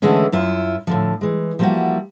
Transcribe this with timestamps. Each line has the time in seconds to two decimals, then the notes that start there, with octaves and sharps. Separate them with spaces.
0.02 D3 E3 G#3 A3 C#4
0.32 F#2 E4 F4
0.87 A2 D3 F3
1.21 E3 G#3
1.59 F3 G3 A#3 B3 E4 F#4